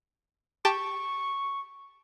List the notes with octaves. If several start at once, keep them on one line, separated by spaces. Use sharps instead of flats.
G4 G5 A5 C#6